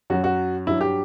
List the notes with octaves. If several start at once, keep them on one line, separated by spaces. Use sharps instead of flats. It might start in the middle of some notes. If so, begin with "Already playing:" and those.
F#2 F#3 F#4
F#4
G2 F#3 E4
G4